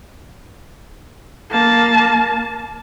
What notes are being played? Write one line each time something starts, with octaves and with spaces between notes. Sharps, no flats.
A#3 A5